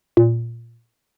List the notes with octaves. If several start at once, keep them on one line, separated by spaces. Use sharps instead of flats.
A#2